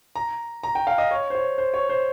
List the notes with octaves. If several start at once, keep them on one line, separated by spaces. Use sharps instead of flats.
A#5
A#5
G5
F5
D#5
C#5
C5
C#5
C5
C#5
C5